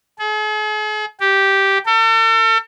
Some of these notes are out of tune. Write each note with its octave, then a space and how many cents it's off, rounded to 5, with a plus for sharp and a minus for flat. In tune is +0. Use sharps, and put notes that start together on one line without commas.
G#4 +45
G4 -5
A4 +40